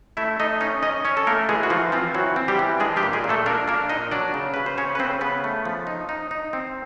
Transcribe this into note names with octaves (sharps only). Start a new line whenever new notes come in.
A3 E4 E5
A3 D#4 D#5
C#4 D#4 D#5
C#4 D#4 D#5
C#4 C#5
A4
A3 A#3 A#4
E3 G#3 G#4
F#4
E3 F3 F4
F3 C4 F4
E3 F#3 F#4
C4
G3 G4
E3
G#3 D4 G#4
G3 G4
A#2
G#3 G#4
A#2
A3 A4
A#3 D4 A#4
A#3 D4 A#4
A#2 D#4 D#5
F#3 D4 D5
C#3
C#3 B4
C5
C#3 C#4 C#5
B4
C#3 C4 C5
C#3 B3 B4
A3
F3
D#4
D#4
D#4
C4